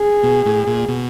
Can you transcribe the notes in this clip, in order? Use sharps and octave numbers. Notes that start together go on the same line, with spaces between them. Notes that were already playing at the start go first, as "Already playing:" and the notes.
Already playing: G#4
B2
A2
A#2
B2